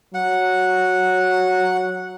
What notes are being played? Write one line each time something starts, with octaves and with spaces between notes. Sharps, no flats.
F#3 F#5